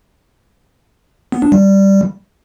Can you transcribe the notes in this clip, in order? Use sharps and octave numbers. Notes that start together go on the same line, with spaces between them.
B3
D4
G3